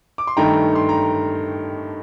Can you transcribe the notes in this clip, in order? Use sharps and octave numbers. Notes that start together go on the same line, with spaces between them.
D6
C6
G2 D#3 A3 D#4 G5 A#5
C6
A#5